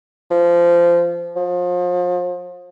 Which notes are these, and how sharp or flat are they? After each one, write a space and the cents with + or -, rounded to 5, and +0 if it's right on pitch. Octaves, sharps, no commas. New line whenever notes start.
F3 -20
F3 +35